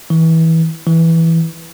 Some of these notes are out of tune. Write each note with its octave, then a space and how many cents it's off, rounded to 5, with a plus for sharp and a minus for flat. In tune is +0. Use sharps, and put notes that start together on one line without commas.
E3 -25
E3 -5